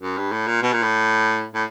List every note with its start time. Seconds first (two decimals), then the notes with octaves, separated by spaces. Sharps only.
0.01 F#2
0.17 G2
0.32 A2
0.47 A#2
0.63 B2
0.73 A#2
0.83 A2
1.55 A2